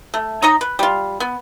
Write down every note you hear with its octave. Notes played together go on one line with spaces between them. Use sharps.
A3
D#4 C#5 D#5 A#5
B4
G3 F4
B3